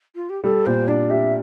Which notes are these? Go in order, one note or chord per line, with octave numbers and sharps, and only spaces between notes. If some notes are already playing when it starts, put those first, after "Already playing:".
F4
G4
G3 A4
A#2 C5
D4 D5
G4 E5